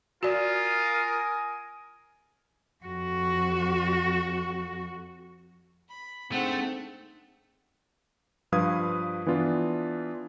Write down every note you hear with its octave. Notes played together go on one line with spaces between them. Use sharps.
F4 F#4 A#4 D5 G#5 D#6
F2 F#4
B5
A3 C4 D4 D#4 G#4 F#5 G5
G2 F3 B4 F5 D#6 G#6
E3 B3 D4 F4